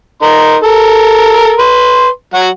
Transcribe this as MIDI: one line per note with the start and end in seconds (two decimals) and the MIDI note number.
0.22 0.56 63
0.22 0.56 70
0.22 0.56 84
0.63 1.55 69
0.63 1.55 70
1.59 2.08 71
1.59 2.08 84
2.34 2.48 54
2.34 2.48 66
2.34 2.48 78